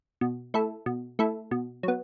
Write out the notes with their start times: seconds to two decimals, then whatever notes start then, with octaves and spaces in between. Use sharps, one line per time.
0.21 B2
0.54 A3 E4 A4
0.86 B2
1.19 A3 E4 A4
1.51 B2
1.83 F#3 B3